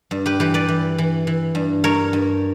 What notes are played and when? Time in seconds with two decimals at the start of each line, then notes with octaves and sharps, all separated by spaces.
0.11 G2
0.26 G4 B4
0.40 E3 G4 B4
0.54 B4 D5
0.68 E3
0.98 E3
1.27 E3
1.55 G2
1.84 G2 A#4 C#5
2.13 G2